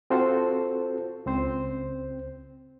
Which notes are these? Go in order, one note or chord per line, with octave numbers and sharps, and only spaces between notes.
C4 F4 F#4 A4 C5
C#2 C4 C5